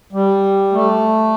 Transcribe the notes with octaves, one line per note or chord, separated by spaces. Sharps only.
G3
A3